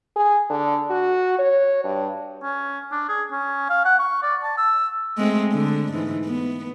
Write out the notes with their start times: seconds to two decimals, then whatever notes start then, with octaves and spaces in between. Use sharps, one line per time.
0.16 G#4
0.50 D3
0.90 F#4
1.39 C#5
1.84 G2
2.43 C#4
2.92 D4
3.09 G#4
3.32 C#4
3.70 F5
3.85 F#5
3.99 C#6
4.23 D5
4.43 A5
4.58 E6
5.18 G#3 A3 C4
5.52 D3
5.93 G#2 E3
6.25 B3